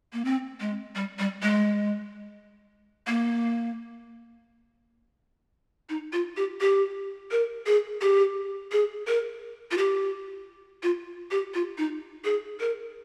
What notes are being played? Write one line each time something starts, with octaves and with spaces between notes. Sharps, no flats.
A#3
C4
G#3
G3
G3
G#3
A#3
D#4
F4
G4
G4
A#4
G#4
G4
G#4
A#4
F4
G4
F4
G4
F4
D#4
G#4
A#4